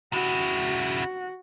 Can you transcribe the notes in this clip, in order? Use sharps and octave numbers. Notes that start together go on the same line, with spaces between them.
C#3 E4 F#4